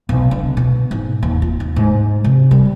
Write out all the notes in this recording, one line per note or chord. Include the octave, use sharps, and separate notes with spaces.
B1
D3
B2
G#2
D#2
F4
D#2
G#2
C3
G3